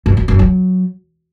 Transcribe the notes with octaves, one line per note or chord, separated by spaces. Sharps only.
F#2
F#2
F#2
F#3